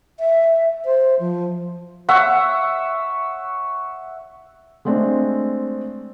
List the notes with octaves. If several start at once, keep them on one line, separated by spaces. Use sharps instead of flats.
E5
C5
F3
C#5 E5 F#5
G#3 A3 C4 D4